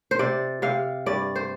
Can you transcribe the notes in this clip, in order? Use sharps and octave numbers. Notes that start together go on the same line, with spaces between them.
C5
C3 D5
C3 F5
G2 D5
C5